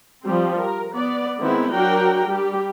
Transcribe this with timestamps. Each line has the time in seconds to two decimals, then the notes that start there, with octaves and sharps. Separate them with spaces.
0.23 F3 G3 C4
0.58 A#4
0.94 B3 D5
1.38 D#3 G#3 B3 C4 E4
1.72 F#3 D4 F#4 A#4 G5
2.26 G3 G4